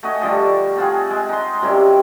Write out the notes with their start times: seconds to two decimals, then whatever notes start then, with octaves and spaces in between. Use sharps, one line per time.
0.03 A3 F#4 D#5 G#5
0.21 D3 F3 G3 A4
0.77 C4 F4 F#4 G#4
1.10 G#3
1.29 D#4 C6
1.62 F#2 C3 G3 E4